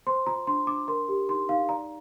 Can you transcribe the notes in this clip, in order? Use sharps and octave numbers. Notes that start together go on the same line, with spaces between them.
C5 C6
F4 A#5
D4 C6
D4 D6
A#4 C6
G4
D#4 C6
D#4 F5
D5 A#5